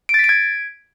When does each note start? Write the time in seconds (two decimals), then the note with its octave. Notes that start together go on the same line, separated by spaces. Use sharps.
0.09 D7
0.14 A6
0.19 B6
0.24 D7
0.29 G#6